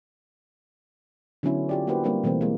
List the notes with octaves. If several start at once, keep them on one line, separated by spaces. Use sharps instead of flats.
D3 F#3 B3 C#4 E4
F4 G4 D5
A#3 E4 F#4 G4 B4 C5
G3 A#3 C4 D4 G4
B2 E3 A3 A#3 C4
G#3 A#3